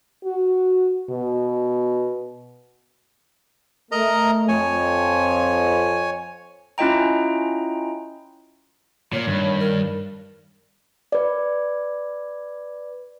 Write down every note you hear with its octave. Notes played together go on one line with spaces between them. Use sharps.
F#4
B2
A3 A#4 D#5 A#5
F2 C#5 G#5
C#4 E4 F4 D#5 G5 A#5
A#2 C#5
G2 D#3
A#4
B4 D5